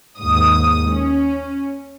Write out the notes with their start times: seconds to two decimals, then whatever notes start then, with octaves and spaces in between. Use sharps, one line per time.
0.19 D#2 G#2 D#6
0.90 C#4